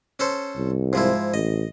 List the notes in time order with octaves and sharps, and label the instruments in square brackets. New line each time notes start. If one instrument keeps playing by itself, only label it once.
[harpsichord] C#4 A4 C5
[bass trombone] C2
[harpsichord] G#2 F3 E4
[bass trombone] A1 [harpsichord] D#5